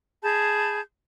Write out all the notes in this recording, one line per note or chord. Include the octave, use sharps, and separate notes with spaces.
G#4 A5 B5 G6